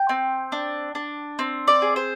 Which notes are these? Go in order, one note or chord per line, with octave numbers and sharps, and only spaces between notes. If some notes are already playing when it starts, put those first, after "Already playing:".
Already playing: G5
C4
D4
D4
C4
D5
G#4
C5